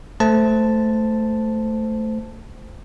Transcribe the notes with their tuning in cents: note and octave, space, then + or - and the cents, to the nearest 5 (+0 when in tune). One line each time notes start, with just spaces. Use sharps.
A3 +0 C5 -15 A5 +0